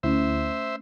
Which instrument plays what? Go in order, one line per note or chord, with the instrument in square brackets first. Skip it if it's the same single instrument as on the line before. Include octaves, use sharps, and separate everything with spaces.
[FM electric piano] D2 E4 [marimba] A3 C#4 [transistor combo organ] C5 E5